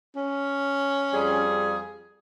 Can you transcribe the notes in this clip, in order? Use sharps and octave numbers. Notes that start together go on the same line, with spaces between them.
C#4
F2 G3 G#4